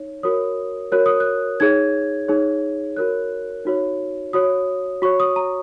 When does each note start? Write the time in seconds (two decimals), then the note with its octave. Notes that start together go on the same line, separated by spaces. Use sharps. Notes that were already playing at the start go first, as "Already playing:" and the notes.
Already playing: D#4 C#5
0.23 F#4 A#4 C#5 D#6
0.92 F#4 A#4 C#5 F#6
1.06 D#6
1.20 F#6
1.60 D#4 G#4 C#5 G#6
2.28 D#4 G#4 C#5
2.96 F#4 A#4 C#5 F#6
3.65 D#4 F#4 C#5
4.33 F#4 C#5 D#6
5.02 F#4 C#5 C#6
5.20 D#6
5.36 A#5